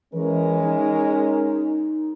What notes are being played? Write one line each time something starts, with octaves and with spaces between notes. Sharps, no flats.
E3 G#3 C#4 A#4
D#4